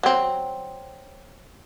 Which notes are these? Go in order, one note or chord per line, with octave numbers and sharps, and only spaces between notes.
F#3 C4